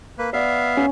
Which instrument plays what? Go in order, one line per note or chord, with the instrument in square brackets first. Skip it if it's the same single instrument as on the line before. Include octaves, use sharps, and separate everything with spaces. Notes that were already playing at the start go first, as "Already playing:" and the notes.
[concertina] A#3 B4
[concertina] B3 E5 F5 [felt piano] D5
[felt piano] C#4